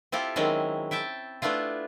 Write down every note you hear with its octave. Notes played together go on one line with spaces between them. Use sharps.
C4 E4 F4 G4 A4
D#3 F#3 G#3 C4 C#4 E4
E4 E5 G5 A5
A3 B3 D4 E4 F4